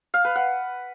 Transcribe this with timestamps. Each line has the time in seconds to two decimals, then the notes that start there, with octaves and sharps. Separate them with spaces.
0.14 F5
0.25 B4
0.36 F#5